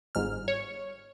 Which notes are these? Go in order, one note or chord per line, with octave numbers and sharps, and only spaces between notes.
G1 G#2 F6
C#5